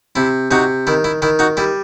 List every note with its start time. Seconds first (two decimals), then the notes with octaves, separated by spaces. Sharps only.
0.16 C3 E4
0.51 C3 D#4 F#4
0.87 D#3 E4
1.04 E4
1.22 D#3 E4
1.39 D#4 F#4
1.57 G3 E4